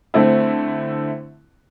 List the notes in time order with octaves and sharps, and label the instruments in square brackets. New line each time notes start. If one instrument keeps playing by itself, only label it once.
[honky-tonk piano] D3 A3 C4 E4